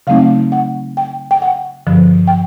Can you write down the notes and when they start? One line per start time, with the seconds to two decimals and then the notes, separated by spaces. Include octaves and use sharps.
0.07 C#3 F#3 A3 C4 D#4 F5
0.52 F#5
0.97 G5
1.31 G5
1.42 F#5
1.87 G2 D3 F3
2.28 G5